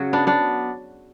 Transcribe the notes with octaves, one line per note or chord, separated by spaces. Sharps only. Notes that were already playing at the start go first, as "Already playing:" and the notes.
Already playing: C#3 F#3 F#4
B3 D4
B3 D4